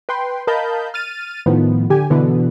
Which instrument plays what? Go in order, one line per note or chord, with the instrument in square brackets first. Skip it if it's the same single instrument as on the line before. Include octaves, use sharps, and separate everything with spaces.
[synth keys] B4 G5 C6
A#4 D#5 F5 A5 B5 G6
F6 A6 D#7
A2 D#3 F3 B3
D3 G4 G#5
B2 D3 E3 B3